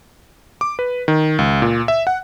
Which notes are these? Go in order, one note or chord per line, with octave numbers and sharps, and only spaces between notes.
D6
B4
D#3
C#2
A#2
E5
F#5